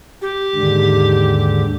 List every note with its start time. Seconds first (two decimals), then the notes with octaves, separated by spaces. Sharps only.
0.21 G4
0.55 D#2 G#2 D3